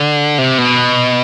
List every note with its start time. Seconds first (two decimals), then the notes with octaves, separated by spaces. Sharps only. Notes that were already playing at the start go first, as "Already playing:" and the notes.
Already playing: D3
0.38 C3
0.58 B2